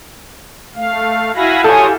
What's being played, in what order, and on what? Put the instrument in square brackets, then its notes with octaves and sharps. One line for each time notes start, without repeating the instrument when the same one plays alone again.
[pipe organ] A3 F5
[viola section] E4 F#4 F5 [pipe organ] G#5 B5 A#6
[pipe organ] F4 C#5 D#6 [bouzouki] G4 G#5 [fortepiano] A4